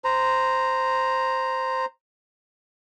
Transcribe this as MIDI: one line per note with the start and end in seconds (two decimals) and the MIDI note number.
0.04 1.85 72
0.04 1.85 82